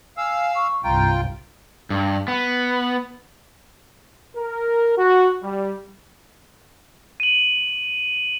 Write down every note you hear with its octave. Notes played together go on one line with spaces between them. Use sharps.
F5 G#5 E6
C#6
C2 G2 F4 G5 A#5
G2
B3
A#4
F#4
G3
D#7 F#7